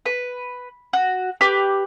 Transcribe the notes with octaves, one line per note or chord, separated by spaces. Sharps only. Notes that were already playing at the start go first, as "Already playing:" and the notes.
B4
F#4
G4 B4 D6